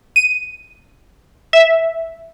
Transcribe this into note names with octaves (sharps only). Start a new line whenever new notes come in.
D#7
E5